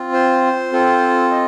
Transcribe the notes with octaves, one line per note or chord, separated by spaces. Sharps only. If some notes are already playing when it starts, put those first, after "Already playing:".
Already playing: C4 F4
C5
C4 F4 A4
D#5